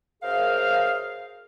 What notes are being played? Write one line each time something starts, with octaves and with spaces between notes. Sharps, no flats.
F#2 G#4 A#4 C5 F5